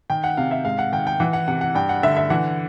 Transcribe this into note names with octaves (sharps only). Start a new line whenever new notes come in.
D#3 G5
F#5
C3 F5
E5
G#2 F5
F#5
D#3 G5
G5
E3 F#5
F#5
C3 F#5
F#5
G2 G5
F#5
D3 E5
E5
E3 F#5